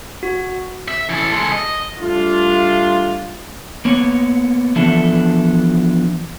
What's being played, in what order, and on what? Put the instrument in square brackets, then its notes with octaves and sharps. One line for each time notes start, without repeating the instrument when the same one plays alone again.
[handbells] F#4
[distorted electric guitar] E5
E3 A4
G#3 A4
D#5
[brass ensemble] G3 A3 D4 F4
[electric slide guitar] A#3 B3 C#5
E3 F3 B3 D4 A4 E5